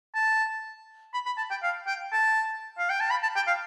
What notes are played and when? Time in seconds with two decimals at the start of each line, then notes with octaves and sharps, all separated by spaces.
0.15 A5
1.13 B5
1.26 B5
1.38 A5
1.51 G5
1.63 F5
1.87 G5
2.12 A5
2.78 F5
2.90 G5
3.00 A5
3.11 B5
3.23 A5
3.36 G5
3.47 F5